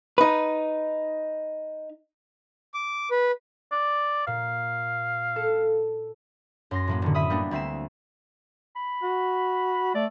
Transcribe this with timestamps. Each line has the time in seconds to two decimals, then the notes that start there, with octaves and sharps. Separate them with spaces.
0.18 D#4 B4
2.74 D6
3.11 B4
3.72 D5
4.27 A#2 F5
5.36 A4
6.71 F#2 C6 A#6
6.87 A2 F#3 A#3
7.02 D#1 D3
7.15 E5 B5 D#6
7.30 G3 A#3 B3 D4
7.51 D2 C4 E5 C7 E7
8.76 B5
9.02 F#4
9.95 A3 D5